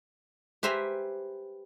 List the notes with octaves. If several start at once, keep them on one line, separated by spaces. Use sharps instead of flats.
G4 B4 C5 E5 G#5 A#5